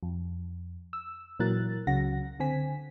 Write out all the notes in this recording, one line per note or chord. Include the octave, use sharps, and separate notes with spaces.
F2
E6
A#2 E3 F#3 A#4 F#6 A6
C#2 C#3 F#3 F#5 A#6
D3 C4 G#5 B6